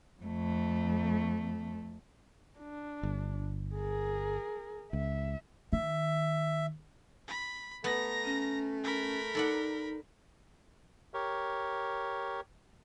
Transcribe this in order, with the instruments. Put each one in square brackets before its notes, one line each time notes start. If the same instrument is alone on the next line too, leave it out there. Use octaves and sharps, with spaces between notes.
[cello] F2 A3
[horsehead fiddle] D4
[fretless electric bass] G1
[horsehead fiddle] G#4 A#4
[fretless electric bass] C#2 [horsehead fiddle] E5
[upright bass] D#3 [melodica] E5
[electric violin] B5
[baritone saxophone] A3 [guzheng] B3 [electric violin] A#5 A#6
[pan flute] C#4
[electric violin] A#4 B5
[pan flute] D#4 [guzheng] A4 D5 F#5
[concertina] G4 A#4 C#5